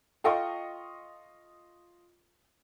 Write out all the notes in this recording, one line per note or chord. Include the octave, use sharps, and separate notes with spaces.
F4 A4 D#5 F5 G5 C#6